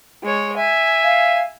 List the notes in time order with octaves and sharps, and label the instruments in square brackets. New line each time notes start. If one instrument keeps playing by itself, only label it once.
[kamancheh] G#3 C#5
[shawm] E5 [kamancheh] G#5
[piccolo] F5